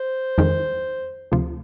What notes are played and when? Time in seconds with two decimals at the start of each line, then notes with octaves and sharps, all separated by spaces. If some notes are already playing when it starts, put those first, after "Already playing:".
Already playing: C5
0.38 F2 D#3 G#3
1.32 D2 C3 F3